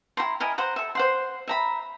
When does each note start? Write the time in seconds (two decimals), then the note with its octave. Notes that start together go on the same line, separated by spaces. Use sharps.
0.17 E4 F#4 A#5 C6
0.40 E4 A#4 D#5 G#5
0.58 C5 F#5 A#5
0.76 A4 E5
0.95 C5 F#5 C6
1.48 E5 A#5 B5